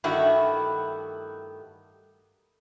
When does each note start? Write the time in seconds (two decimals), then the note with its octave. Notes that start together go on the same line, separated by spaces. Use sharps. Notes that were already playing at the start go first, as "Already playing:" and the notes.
0.04 G2 D#3 A3 E4 F#4